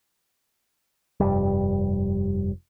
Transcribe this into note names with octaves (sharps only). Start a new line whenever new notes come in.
F1 G2 G3